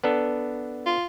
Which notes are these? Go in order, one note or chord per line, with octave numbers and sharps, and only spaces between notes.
B3 D4 A4
F4